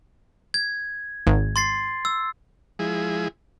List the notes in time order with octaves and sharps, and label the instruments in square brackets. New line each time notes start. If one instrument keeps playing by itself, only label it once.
[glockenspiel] G#6
[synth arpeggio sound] G#1
[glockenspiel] C6 A6 C7
E6
[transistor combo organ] F3 G#3 E4 G#4